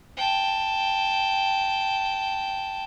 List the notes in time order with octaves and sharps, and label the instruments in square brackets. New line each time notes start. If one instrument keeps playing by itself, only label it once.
[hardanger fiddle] G5 A5